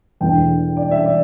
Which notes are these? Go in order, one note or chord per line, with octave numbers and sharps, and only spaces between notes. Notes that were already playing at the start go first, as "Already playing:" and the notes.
E1 E2 E3 A3 D4 G5
D5
E5
D5